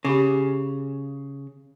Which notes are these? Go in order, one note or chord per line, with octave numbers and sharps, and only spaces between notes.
C#3 G4 B5 D6